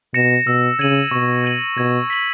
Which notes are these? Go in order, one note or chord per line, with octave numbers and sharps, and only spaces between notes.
B2 A#6 C#7 E7
B2 E6
C#3 G#6 D#7 F#7
B2 C#6
G#6 D#7 F#7
B2 G#6
B6 F#7